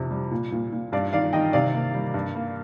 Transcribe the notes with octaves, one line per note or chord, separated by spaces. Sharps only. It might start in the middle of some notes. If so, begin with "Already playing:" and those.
Already playing: F2 C3
G3
A#2
A#2
A#2
G2 D5 F5
D#3 D5 F5
D#3 D#5 G5
C3 D5 F5
A#3
G3
G2
A#3